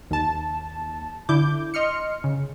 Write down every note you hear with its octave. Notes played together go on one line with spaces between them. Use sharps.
D#2 A5
D3 E4 D6 G6
D#5 C6 F6 C#7
C#3